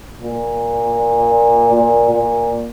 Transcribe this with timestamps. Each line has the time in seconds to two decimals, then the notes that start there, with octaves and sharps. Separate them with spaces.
0.21 A#2
1.73 A#2
2.11 A#2